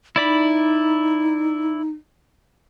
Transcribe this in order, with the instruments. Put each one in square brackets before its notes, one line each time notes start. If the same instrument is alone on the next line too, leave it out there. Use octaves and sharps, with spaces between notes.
[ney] D#4 [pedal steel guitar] E4 D5 B5